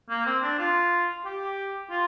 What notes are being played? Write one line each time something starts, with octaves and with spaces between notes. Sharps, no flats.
A#3
C4
D4
F4
G4
F4